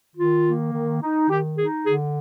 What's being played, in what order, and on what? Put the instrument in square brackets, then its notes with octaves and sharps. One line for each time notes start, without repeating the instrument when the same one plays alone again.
[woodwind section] D#3 F4
A#3
D#3
D#4
D#3 G4
D#4 G#4
D3 G#4